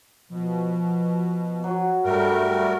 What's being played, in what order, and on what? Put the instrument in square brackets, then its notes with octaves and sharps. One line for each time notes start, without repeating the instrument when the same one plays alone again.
[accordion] B2 [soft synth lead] F3
[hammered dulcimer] F#3
[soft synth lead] G2 [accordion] G3 A3 A#4